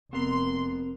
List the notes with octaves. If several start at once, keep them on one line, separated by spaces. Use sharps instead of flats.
F1 B3 C4 A#4 C6